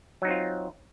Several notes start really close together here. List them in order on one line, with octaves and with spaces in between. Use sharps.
F#3 D#4 C4 F4